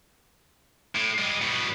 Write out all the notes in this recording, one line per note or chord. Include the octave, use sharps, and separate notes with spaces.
A2
G3 G#3
B2 G3